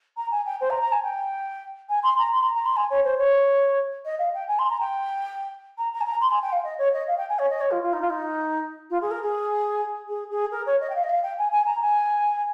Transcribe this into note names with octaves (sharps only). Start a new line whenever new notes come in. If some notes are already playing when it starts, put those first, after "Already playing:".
A#5
G#5
G5
C5
A#5
A#5
G#5
G5
G#5
C6
A#5
C6
A#5
A#5
C6
G#5
C#5
C5
C#5
D#5
F5
G5
G#5
C6
A#5
G5
A#5
A#5
G#5
A#5
C6
G#5
G5
F5
D#5
C#5
D#5
F5
G5
G#5
C#5
D#5
C#5
F4
F4
D#4
F4
D#4
F4
G#4
A#4
G#4
G#4
G#4
A#4
C#5
D#5
G5
F5
D#5
F5
G5
G#5
G#5
A#5
G#5